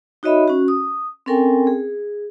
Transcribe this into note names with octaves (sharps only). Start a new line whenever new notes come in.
D#4 F#4 C#5 D#5 E5 B5
C#4 F#4
D#6
C4 C#4 A4 A#4 G5 G#5
G#4